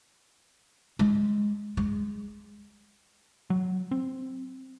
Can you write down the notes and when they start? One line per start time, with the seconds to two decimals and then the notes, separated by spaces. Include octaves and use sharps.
0.99 G#3
1.77 G#3
3.50 F#3
3.91 C4